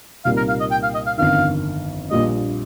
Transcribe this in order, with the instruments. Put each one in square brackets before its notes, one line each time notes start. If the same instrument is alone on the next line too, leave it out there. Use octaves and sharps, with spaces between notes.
[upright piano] C2 A#2 G3 A#3 D#4 [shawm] F5
[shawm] A#4
F5
D#5
G5
F5
D#5
F5
[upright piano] G1 F2 D#3 [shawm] F5
[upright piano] A#1 A#2 G3 [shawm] D#5